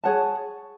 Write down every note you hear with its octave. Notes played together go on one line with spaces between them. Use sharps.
G#4 C#5 F#5 A5